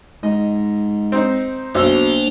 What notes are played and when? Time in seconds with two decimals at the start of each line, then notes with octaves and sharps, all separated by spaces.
0.23 G#2 D#5
1.12 C4 D#4
1.75 B1 B2 A#3 D4 C5 E6